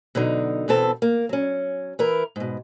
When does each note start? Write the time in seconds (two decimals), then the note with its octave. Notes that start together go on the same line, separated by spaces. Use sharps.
0.15 B2 D3 F#3 D#4
0.68 E2 B2 E3 C4 A4 A5
1.02 A#3
1.29 F#3 C#4
1.99 E3 E4 A#4
2.36 G#2 B2